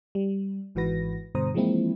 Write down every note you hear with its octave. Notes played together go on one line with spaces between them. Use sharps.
G3
G#1 G#2 E3 F#4 B4 A#6
G2 B2 D3 C5 A#5 D#6
E3 F3 G#3 A#3 C4 E4